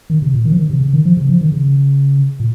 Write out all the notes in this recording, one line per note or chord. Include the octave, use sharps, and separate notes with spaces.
D#3
C3
A#2
D#3
F3
D#3
C3
C#3
D#3
F3
C#3
F3
D#3
C#3
A#2